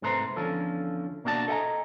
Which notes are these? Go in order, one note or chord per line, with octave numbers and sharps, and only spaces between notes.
G#2 C3 A3 B4 C5 A#5
E2 D3 F3 C#4 A4
B2 A#3 D4 F#4 D5 A5
A4 D#5 E5 G5 G#5 A#5